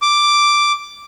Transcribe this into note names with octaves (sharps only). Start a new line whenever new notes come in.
D6